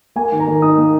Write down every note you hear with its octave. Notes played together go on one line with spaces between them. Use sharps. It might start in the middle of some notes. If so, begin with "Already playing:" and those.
A#3 G#5
D#3
A#5
D#3
D#4 D#6
A#3